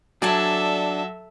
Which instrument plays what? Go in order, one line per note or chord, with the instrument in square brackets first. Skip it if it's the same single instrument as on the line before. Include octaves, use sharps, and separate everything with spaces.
[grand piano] F#3 [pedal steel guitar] D4 [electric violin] A4 E5 [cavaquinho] D5 G#5 A5